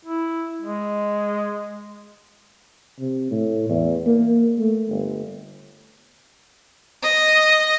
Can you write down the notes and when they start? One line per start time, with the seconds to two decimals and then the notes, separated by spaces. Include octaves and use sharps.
0.05 E4
0.61 G#3
2.99 C3
3.31 A2
3.69 E2
4.06 A#3
4.59 A3
4.89 G1
7.03 D#5